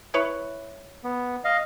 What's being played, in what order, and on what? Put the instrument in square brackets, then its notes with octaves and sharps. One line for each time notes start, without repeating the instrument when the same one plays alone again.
[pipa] E4 B4 C#5
[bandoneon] B3
D#5 F5